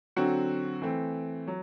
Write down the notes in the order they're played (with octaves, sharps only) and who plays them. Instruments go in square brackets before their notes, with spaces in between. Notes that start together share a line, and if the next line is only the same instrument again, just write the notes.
[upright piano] D3 F#3 C4 F#4
E3 A3 C4
F#3